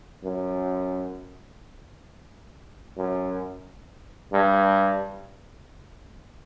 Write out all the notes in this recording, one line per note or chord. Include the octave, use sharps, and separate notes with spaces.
F#2
F#2
G2